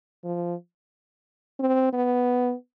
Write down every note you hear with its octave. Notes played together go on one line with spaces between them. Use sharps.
F3
C4
B3